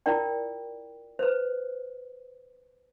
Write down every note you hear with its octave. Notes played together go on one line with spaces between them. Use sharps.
E4 F4 A#4 D5 G5
B4 C5